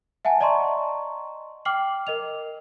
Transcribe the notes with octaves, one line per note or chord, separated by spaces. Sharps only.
E5 F#5 G#5 A5
D5 D#5 A5 A#5 C6 C#6
G5 D6 F6 C7 F#7
A#4 D#5 F7